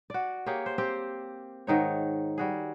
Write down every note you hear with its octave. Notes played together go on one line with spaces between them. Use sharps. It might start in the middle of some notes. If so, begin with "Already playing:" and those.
F#4 D5
A#3 G4 G#4 C#5
C5
C4 G4
G#2 D#3 D#4 C#5
G3 F#4 G#4